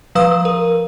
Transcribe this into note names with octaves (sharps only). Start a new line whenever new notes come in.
F3 B4 F5 D#6 E6
A#4